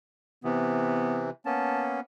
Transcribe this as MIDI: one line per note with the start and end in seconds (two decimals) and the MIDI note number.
0.44 1.30 48
0.44 1.30 52
0.44 1.28 59
1.46 2.00 58
1.46 2.00 59
1.46 2.00 61
1.46 1.84 81